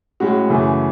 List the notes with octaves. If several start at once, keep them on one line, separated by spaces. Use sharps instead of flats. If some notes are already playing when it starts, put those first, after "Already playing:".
A2 G#3 C#4 F#4
F#2 C#3 E3 A3 C#4